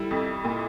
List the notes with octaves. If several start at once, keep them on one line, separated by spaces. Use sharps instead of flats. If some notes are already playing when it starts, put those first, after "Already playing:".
Already playing: G3 E4
F2
A#2